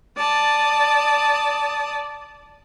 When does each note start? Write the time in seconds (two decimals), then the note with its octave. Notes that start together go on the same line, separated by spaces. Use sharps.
0.18 D5 A5 D#6